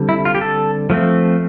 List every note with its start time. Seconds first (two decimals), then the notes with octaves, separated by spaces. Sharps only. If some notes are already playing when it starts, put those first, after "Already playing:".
Already playing: D3 G3 C4
0.09 E4
0.25 F4
0.35 G4
0.41 A4
0.90 F3 A3 C4